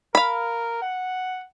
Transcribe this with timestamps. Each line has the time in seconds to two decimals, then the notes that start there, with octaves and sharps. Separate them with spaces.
0.15 A#4 F5 B5
0.82 F#5